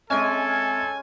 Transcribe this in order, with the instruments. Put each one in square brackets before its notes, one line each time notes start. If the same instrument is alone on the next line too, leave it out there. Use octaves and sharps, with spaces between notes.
[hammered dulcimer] G#3 C#4 [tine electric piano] C4 D#5 E5 [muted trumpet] A4 [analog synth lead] G#5